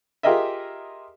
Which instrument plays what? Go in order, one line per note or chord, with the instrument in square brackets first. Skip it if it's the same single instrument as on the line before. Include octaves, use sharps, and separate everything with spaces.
[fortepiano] F4 G4 G#4 A#4 D#5 E5